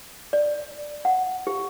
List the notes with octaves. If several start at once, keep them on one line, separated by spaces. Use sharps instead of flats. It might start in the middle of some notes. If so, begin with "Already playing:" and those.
D5
F#5
G4